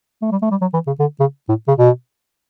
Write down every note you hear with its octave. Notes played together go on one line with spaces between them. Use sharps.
A3
G3
A3
G3
F#3
E3
C#3
D3
C#3
A2
C#3
B2